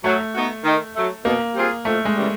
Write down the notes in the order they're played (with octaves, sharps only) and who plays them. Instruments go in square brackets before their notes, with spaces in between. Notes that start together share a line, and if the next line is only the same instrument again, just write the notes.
[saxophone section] F#3 [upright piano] A3
[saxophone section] B3 D#4 F#4
D#3
F#3 A3
[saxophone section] B2 [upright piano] A#3
[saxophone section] G3 C4 F4 G#4
[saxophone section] F2 [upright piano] A3
[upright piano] G#3
[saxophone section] C#3 E3 G3